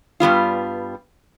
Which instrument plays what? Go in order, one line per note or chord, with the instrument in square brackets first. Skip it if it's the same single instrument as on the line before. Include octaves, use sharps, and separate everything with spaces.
[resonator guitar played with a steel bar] G2 G3 B3 F4